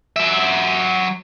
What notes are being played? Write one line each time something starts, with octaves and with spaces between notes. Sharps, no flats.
F#3 E5